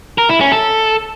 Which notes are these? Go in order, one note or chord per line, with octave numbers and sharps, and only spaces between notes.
A#4
E4
C#4
A4